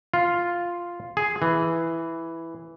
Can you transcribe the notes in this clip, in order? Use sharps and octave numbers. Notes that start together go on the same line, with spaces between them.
F4
G#4
E3